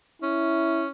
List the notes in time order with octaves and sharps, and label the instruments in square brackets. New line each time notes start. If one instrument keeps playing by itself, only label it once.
[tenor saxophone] C#4 [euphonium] E4